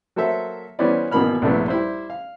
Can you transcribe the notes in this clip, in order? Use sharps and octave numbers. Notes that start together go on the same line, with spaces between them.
F#3 A#3 A4 C5 E5
E3 G3 B3 C#4 C5 D5
G#1 B2 E3 A#3 B5 F6
A#1 G2 C3 A3 B3 E4
G3 E4 C5
F5